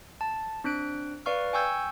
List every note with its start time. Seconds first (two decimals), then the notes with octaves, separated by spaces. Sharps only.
0.21 A5
0.64 C4 D4 F#6 D7
1.26 B4 D5 F5 C#6 F6
1.53 G5 G#5 C#6 E6 G6 G#6